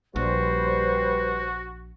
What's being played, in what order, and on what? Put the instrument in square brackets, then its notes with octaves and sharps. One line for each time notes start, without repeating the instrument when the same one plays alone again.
[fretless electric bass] A#1 [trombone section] G3 B4 [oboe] F#4 [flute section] C5